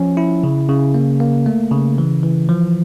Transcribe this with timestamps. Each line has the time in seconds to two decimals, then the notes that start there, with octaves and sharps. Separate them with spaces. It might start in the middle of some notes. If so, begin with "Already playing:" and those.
Already playing: F3 C#4
0.17 E4
0.43 C#3
0.69 C#3
0.94 A#3
1.20 A#3
1.46 A3
1.72 C#3
1.98 E3
2.23 E3
2.49 F3